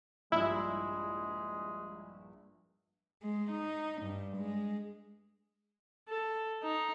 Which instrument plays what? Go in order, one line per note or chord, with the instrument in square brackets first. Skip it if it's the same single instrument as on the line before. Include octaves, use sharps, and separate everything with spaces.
[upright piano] A#1 G2 [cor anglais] G#3 [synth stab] E4
[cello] G#3
D#4
G2
G#3
[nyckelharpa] A4
D#4